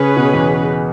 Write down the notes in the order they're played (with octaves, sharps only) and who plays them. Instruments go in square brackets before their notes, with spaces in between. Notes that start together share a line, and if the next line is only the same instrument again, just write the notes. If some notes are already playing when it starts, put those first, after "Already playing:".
Already playing: [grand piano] C#3 [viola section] C#4 G#4 B4
[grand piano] B2
E2